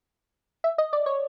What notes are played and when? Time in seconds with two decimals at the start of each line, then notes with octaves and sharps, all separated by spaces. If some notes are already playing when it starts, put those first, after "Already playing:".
0.64 E5
0.78 D#5
0.93 D5
1.06 C#5